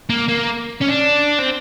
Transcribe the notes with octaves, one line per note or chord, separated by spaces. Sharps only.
A#3
A#3
C#4
D4
C4